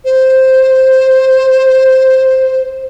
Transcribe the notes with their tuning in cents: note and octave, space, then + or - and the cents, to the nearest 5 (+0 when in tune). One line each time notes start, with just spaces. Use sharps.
C5 +0